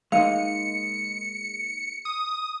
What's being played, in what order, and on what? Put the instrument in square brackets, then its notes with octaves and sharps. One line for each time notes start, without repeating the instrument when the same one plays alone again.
[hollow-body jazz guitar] G#3 A#3 D#4 [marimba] F5 [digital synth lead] C#7
[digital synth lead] D#6